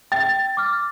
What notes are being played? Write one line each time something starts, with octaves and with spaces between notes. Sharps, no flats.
G5 A6
D6 F6